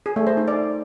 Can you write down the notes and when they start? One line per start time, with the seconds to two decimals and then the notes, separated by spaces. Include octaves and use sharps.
0.06 G#4
0.16 A3
0.27 C5
0.37 D#4
0.48 D5